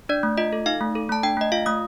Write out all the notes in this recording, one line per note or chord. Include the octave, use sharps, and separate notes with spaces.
D4 D5
A3
F4 D#5
A4
D#4 F5
A3
A4
A3 A5
D4 G5
A3 D#5
F4 F5
A3 D#6